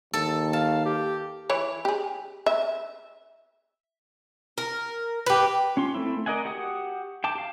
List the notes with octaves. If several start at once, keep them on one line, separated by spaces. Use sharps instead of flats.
D#2 A4
F5 A5
G4
E3 E4 C#5
G4 G#4
E5
A#4
G4 B4
C#4 F4 C6
A3 B3 C4 E4
A#4 D5 D#5 F#5 G#5
F#4 G4 F#5 D#6
G5 A5 D6
G4 F5